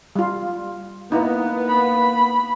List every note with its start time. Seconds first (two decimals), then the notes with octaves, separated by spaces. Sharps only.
0.16 G3 F4
1.12 A#3 B3 D#4 E4
1.68 B5